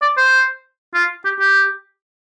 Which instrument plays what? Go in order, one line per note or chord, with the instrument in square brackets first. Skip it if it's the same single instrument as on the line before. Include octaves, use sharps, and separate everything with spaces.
[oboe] D5
C5
F4
G4
G4